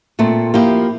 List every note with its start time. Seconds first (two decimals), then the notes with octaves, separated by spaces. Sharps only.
0.19 A#2 A3 C4
0.54 F3 A#3 E4 G4